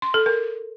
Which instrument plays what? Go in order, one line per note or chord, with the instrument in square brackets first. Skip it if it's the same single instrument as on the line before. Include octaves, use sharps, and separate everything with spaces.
[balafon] C6
A4
A#4